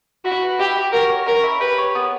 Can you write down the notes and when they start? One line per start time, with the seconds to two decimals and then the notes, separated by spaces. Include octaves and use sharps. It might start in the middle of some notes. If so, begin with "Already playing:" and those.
0.25 E4 F#4
0.42 B4
0.59 E4 G4
0.77 G4
0.92 F#4 A#4
1.09 C#5
1.26 C#4 A#4
1.43 E4
1.60 G4 B4
1.78 C#5
1.95 B3